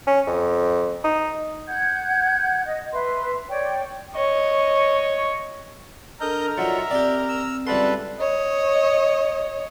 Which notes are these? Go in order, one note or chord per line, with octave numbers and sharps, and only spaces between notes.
C#4
F2
D#4
F#5 G6 G#6
D#5 F#5
B4 E5 C6
C#5 D5 G5
C#5 D#5
D4 A4 A#4 D#5 A#5 F6 G6
F#3 D#4 F4 D5 E5 F#5
C4 G4 D5
E6
C#2 G3 A4 B4 D5 E5 F#5 C6
C#5 D#5